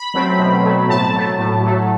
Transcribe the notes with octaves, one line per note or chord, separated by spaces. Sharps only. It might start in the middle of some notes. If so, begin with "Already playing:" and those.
Already playing: B5
F#3 A3 C4
B2
F#3 A3 C4
A2 A5
F#3 A3
A2
F#3 A3